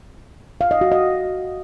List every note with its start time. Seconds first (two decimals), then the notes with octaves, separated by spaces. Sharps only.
0.61 F5
0.71 D#5
0.81 F#4
0.92 D#5